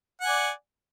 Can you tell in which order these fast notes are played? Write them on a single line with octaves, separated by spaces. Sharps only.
F#5 G#5 D5